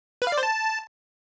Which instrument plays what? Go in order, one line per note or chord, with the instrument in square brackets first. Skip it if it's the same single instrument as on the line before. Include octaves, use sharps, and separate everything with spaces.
[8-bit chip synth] B4
F5
D5
C5
A5